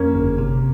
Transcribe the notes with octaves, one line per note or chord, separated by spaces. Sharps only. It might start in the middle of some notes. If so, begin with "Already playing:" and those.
Already playing: F2 A#3 C#4
G1
C3